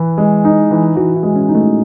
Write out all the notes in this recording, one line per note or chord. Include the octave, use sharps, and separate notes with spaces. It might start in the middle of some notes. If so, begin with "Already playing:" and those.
Already playing: E3 E4
G#3
D#4
E3
E3 F#4
E4
G#3
C#4
D#4
A3